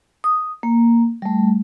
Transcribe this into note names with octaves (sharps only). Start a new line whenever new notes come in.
D#6
A#3
G3 A3